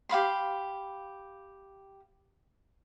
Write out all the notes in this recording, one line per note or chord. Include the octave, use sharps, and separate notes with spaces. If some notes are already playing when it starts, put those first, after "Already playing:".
G4 F5 B5 C6